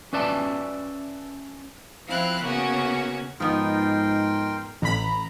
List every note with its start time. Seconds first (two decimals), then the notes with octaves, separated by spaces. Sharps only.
0.13 C#4 B4 D5 E5 A5
2.07 F3 C4 E4 F5 F#6
2.44 C#3 A#3 B3 C#4 F#4
3.40 G#2 F3 B3 D#4 A#4 G5 C6
4.82 A1 A#5 B5